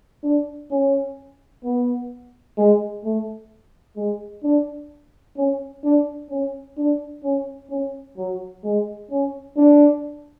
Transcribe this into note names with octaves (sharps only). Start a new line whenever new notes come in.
D4
C#4
B3
G#3
A3
G#3
D4
C#4
D4
C#4
D4
C#4
C#4
F#3
G#3
C#4
D4